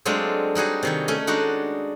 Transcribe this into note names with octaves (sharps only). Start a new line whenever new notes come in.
F#3 G#3 A3 C4 D4 F4
G3 D#4 F#4 G#4
C3 D#3 C#5
A3 C#4 G#5
G#3 D4 D#4 F#4